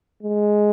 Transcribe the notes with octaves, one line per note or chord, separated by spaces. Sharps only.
G#3